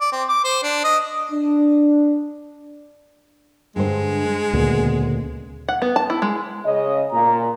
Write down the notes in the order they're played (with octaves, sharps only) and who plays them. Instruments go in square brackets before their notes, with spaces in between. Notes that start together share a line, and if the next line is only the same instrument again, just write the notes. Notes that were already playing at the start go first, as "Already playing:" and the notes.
[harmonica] D5
C4
D6
C5
D4
D#5
[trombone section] D4
[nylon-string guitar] G2 D3 C5 [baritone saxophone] G#3
[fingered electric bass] D2 A#2 C#3 [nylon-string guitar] B3
[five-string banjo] F#5
B3
A5
E4
G#3
[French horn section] C#3 D#5
[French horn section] A#2 [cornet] A#5